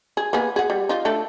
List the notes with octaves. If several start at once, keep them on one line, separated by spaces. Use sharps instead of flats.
G#4
A#3 B3 G#4
G#4 F#5
G3
D#4 F4
A3 D4 A4